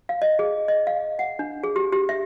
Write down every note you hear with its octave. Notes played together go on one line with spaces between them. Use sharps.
F5
D#5
G#4
D#5
F5
F#5
D4
G#4
G4
G4
E5